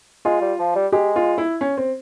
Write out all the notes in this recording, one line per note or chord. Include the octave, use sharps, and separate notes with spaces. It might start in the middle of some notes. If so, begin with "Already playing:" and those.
G#3 F4
G3
F3
G3
G#3 G4
F4
E4
C#4
C4